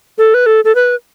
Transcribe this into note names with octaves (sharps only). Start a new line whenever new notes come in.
A4
B4
A4
A4
B4